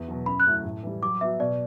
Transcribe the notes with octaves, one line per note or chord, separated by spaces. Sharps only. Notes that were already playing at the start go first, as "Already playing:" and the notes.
Already playing: E2
B2 F#3
F#2 B5
F#6
C#3 F#3 A3 E4
A2
E3 G3
F#3 D6
B3 F#4 E5
B2 D5